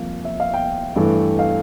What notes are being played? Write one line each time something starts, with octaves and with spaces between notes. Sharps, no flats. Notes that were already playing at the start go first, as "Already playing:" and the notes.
Already playing: C2 C3 F3 A#3 F5
E5
F5
G5
G2 E3 A3
F5